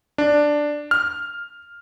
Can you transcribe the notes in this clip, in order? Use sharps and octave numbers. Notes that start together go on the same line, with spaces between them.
D4
F6